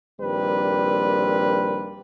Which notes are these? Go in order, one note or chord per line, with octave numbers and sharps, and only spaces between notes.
A#1 D#3 G3 A#3 C4 B4